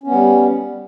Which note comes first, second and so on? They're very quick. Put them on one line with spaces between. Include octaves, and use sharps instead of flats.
C#4 B3 G3